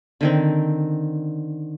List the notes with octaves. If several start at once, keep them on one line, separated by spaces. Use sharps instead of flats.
D3 D#3 C4